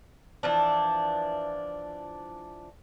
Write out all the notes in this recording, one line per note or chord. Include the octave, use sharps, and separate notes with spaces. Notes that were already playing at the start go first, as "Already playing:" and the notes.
E3 F3 D4